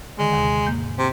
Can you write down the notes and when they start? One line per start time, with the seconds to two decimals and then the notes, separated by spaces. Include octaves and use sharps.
0.19 D3 D#3 G#3
0.33 D#2 C3
0.67 G#2 A#3 G6
0.98 C3 C5